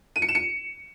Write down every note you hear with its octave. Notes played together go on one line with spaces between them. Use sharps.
D#7
C#7
E7
C#7